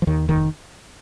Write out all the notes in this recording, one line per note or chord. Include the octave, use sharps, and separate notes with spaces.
F3
D#2 D#3
F1 D#3